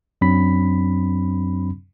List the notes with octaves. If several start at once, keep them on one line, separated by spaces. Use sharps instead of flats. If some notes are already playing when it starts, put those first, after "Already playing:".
F#2 F#3 C4 D4 B5 B6